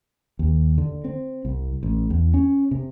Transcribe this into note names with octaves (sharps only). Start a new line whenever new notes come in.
D#2
D3
C4
C2
A1
E2
C#4
C3